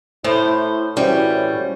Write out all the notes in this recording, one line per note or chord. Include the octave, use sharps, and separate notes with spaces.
A2 E4 C5
E3 G3 C#4 F#4 C5